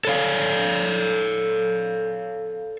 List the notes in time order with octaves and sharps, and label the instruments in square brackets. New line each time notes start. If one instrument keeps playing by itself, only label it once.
[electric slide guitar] A4 C#5 F5